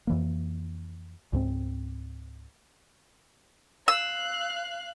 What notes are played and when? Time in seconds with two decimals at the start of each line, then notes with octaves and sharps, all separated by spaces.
0.07 F2 E3 A#3
1.33 C#2 G#2 C4
3.88 F5 E6 F#6